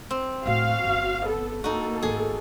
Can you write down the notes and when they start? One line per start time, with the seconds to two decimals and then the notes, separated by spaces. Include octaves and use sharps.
0.11 C4
0.46 A2 A3 F#4 F5
0.84 G1
1.25 B3 A4
1.64 A#3 D#4 F#4 A4
2.03 G#1 A3 G#4